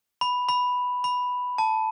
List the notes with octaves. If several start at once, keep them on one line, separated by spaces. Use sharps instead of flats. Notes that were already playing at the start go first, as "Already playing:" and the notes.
B5
B5
B5
A5